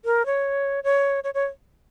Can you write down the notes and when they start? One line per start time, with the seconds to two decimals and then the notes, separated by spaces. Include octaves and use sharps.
0.05 A#4
0.26 C#5
0.84 C#5
1.24 C#5
1.34 C#5